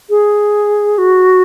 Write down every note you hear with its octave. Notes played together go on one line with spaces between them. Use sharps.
G#4
F#4